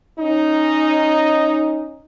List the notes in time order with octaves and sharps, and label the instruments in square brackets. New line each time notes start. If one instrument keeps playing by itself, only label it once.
[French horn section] C#4 D#4